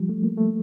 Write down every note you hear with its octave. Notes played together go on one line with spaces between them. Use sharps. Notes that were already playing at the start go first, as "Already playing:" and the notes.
Already playing: F3 G3
A3
A#3
A3